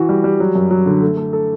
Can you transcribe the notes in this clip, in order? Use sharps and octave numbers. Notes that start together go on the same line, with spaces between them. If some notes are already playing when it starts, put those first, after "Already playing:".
Already playing: E3 F#4
G3
G3
F#3
F#2
F#3
D3
A3
A3
A4